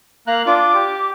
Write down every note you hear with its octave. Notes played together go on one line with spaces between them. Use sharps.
A#3 F5 A#5 F#6
D4 F4 D6
G4